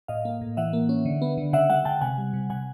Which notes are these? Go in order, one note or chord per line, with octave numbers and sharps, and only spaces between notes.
A2 D#5 F5
A#3
A2
E3 E5 F#5
A#3
C#4
D3
B3
D3
C#3 E5 F#5
G#3 E5 F#5
C#3 G5 A5
C3 F#5 G#5
G3
C3
C3 F#5 G#5